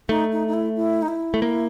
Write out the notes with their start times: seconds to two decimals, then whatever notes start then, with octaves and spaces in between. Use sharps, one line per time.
0.09 A3 D#4
0.32 D#4
0.48 D#4
0.53 E4
0.76 E4
1.02 D#4
1.08 E4
1.34 A3
1.42 A#3